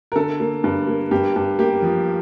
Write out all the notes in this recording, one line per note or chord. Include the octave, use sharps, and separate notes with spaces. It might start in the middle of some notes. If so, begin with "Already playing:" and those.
A#4
D3 A4
A#3
G2
A#3
G2 G4
G2
A#3 G4
F3